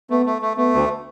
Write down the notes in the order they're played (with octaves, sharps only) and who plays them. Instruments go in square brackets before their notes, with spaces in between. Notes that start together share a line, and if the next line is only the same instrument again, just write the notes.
[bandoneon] A3 [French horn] B3
[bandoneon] A3
A3
[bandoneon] A3 [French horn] B3
[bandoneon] D2